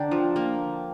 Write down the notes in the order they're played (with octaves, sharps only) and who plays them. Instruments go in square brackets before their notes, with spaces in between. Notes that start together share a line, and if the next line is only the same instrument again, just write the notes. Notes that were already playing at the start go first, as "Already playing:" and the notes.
Already playing: [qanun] D3 D4 [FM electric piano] G5 A#5
[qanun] F3
A#3